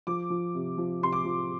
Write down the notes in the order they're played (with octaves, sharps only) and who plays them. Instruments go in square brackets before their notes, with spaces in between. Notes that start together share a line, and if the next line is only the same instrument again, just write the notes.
[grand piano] F3 D6
F3
C3
F3
C3 C6
D6
F3